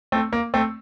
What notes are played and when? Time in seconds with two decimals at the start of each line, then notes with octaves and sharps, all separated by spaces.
0.12 A3 C4
0.33 A#3
0.54 A3 C4